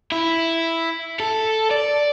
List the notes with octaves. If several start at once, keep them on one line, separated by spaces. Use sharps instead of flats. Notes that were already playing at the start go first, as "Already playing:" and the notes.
E4
A4
D5